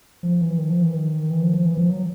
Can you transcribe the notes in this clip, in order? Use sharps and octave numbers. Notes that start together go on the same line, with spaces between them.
F3
E3
D#3
F3
E3
D#3
E3
F3
F3
E3
F3
F#3